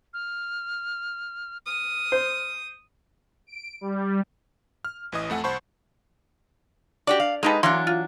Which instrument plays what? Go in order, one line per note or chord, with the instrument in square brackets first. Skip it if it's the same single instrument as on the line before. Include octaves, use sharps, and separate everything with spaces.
[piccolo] F6
[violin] D#6 [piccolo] F6
[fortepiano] C5
[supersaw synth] D7
G3
[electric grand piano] F6
A1 E3 D#5 D#6
F2 A3 F#5 G#5
C2 C5 F#5 A5 B5 C#6
[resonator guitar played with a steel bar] D4 F#4 G4 [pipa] D5
[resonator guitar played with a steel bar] F5
[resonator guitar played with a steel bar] G#3 D#4 B4 [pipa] A#3 G4 A4
[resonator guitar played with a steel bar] E3 F#3 D4 [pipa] A#3 C6
[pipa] F4